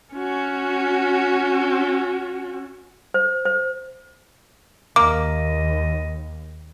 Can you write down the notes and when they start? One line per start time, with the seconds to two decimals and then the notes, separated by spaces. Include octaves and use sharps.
0.14 C#4 F#4
3.14 C5
3.45 C5
4.96 D#2 A#3 D#5 D6